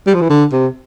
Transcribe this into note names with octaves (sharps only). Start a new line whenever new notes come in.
G3
F3
E3
D3
C3